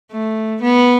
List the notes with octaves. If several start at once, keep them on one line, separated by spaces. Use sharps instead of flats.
A3
B3